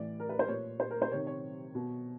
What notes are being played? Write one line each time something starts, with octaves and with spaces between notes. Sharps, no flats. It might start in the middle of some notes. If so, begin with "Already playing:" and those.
Already playing: A2 E3 D5
A#4
B4
C5
A#2 C#5
C5
A#4
C5
C3 D#3 C#5
C#5
B2